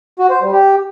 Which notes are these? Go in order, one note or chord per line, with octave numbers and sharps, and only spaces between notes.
F#4
C5
G3
G4